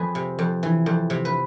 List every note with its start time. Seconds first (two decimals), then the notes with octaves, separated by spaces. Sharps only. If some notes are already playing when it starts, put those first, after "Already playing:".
Already playing: F2 G#4 B4
0.15 C3
0.39 F2
0.63 E3
0.86 F2
1.10 C3
1.25 B4